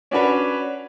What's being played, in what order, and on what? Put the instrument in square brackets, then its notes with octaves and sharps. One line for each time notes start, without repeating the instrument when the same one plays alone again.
[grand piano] C#4 D4 F#4 B4 C#5